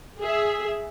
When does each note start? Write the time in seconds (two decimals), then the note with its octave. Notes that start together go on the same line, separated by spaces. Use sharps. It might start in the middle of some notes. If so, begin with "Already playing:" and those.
0.20 G#4 E5